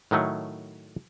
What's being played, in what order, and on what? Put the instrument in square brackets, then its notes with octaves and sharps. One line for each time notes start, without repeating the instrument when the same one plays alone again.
[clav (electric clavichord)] A2 D#3 F#3 A3